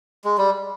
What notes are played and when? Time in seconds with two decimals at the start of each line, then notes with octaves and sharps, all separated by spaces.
0.24 G#3
0.38 G3